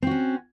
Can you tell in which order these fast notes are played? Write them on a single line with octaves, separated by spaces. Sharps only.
C4 F#4 C#4